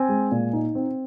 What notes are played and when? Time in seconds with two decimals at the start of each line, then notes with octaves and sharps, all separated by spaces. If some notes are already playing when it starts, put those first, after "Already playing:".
Already playing: C4 G#5
0.09 G#3
0.31 A#2
0.53 D#4
0.75 C4